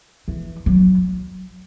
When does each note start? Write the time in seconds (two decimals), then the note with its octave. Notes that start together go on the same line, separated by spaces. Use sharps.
0.28 E3
0.66 F#3